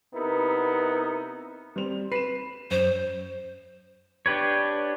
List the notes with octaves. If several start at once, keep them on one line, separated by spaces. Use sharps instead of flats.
C3 B3 D#4 E4 A#4
G3 C4 F7
B4 C7 E7
F#2 C5
D4 G4 B4 C#5